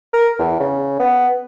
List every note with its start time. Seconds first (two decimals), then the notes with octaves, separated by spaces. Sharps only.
0.13 A#4
0.39 E2
0.60 C#3
0.99 B3